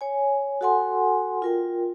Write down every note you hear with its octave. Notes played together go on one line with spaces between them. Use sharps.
C#5 G#5
F#4 A4 F#5 G#5 C6
F4 A#4 G5